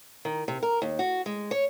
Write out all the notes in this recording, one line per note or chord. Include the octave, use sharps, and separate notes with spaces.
D#3
C3
A#4
D#2
F#4
G#3
C#5